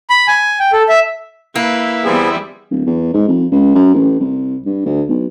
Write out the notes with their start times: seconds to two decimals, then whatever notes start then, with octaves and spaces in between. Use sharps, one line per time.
0.10 B5
0.28 G#5
0.60 G5
0.72 A4
0.89 E5
1.56 A#3 E4 B4
2.04 E2 E3 G3 B3 C4 G#4
2.71 D1
2.86 E2
3.14 G#2
3.28 F2
3.52 C#2
3.75 F#2
3.94 A1
4.20 C2
4.66 G2
4.85 D2
5.09 B1